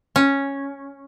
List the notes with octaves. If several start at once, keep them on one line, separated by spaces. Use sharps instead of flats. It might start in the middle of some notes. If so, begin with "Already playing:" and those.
C#4